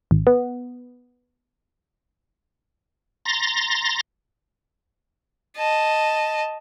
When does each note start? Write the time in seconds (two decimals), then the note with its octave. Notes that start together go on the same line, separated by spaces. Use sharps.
0.11 G#1
0.27 B3
3.25 A#5 C6 A6 A#6
5.57 D#5 A5